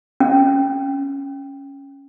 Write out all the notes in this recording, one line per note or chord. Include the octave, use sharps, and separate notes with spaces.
C#4